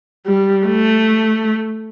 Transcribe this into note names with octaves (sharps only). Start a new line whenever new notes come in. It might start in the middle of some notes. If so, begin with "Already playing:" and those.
G3
A3